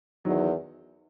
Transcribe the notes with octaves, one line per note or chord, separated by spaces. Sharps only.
E2 D#3 F#3